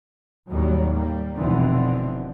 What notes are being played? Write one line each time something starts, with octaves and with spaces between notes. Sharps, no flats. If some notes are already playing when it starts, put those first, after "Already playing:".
D#2 A2 F#3 G3
G3 A#3
F1 B2 D3 E3 C4